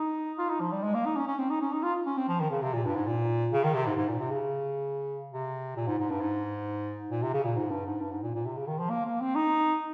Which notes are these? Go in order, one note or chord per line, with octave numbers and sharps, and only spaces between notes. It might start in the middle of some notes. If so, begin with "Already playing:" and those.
Already playing: D#4
F4
D#4
F3
G3
G#3
A#3
D#4
C#4
C#4
C4
D#4
C#4
D#4
F4
C#4
C4
F3
D#3
C#3
C3
A#2
G2
G#2
A#2
C#3
D#3
C3
G#2
G#2
A#2
C3
C#3
C3
A#2
G#2
G#2
G2
G#2
A#2
C3
C#3
A#2
G#2
G2
G#2
G2
G#2
A#2
A#2
C3
C#3
D#3
F3
A#3
A#3
C4
D#4